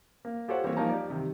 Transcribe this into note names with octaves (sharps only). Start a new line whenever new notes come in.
A#3
F4 G4 A4 C5 C#5 F#5
E3 G3 A#3 C4 G4 C#5
F3 A#3 D#4 A5 A#5
G4 D5
C3 D#3 G3